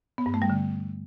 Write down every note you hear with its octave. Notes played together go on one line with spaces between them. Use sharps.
B3
G2
A3
G3
D3